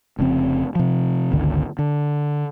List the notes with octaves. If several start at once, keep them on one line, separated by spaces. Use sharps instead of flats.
F1 C#3 F3 C4
C3 F3
G1 C#2 D3 D#3
D3